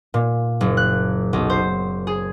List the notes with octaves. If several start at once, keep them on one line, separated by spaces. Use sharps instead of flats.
A#2
F#1
F#6
B1
C5
G#4